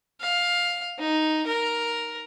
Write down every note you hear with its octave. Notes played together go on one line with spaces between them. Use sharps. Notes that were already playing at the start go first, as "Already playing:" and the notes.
F5
D#4
A#4